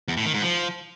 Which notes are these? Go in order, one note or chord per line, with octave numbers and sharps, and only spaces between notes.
E2
A2
D#3
G#2
F3